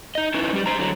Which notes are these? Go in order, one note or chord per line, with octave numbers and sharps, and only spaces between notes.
D#4 D#5
C#4 D#4 E4 B4
G3 G4
G#2 C5 A#5
D3 F#3